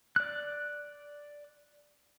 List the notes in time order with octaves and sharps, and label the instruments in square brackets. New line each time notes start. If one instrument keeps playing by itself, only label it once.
[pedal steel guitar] D5 F#6